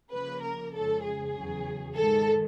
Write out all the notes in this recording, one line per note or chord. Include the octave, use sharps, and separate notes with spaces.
C#3 F3 A#3 B4
A#4
F2 C#3 F3 G#3 A4
G#4
E2 C#3 F#3
G#2 D#3 G#3 A4